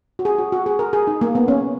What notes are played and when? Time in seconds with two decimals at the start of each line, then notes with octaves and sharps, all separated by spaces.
0.19 F#4
0.25 G#4
0.38 F#4
0.52 F#4
0.66 G#4
0.79 A#4
0.93 G#4
1.07 D#4
1.21 A#3
1.35 B3
1.48 C#4